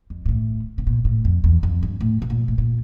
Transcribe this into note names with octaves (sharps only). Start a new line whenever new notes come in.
F2
A#2
A2
C3
A#2
A2
F2
E2
F2
G2
A2
C3
A#2
A2
A#2